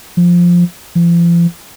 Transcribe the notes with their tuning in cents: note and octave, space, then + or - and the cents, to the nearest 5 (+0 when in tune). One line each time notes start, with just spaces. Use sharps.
F3 +5
F3 -40